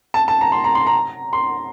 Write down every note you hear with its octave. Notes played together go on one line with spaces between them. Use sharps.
A5
A5
A#5
C6
A#5
C6
A#5
C6